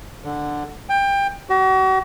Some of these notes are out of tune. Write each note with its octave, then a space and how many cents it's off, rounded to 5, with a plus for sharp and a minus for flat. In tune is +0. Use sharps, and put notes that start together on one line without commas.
D3 +5
G5 +20
F#4 +40